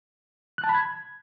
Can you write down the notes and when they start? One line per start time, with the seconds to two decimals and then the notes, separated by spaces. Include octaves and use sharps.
0.58 F#6
0.64 A5
0.69 B5
0.75 G#6